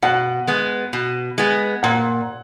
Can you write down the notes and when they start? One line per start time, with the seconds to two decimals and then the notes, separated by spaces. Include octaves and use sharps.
0.02 B2 F#5
0.47 G#3 B3
0.93 B2
1.38 G#3 B3
1.83 A#2 F#5